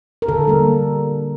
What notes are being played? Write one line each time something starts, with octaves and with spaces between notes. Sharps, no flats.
A#4
D3 A4
G3 A#3